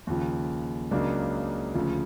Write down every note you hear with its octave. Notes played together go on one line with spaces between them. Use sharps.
D#2 C#3 F3
C#2 C#3 F#3 A#3 D4
D2 C#3 F3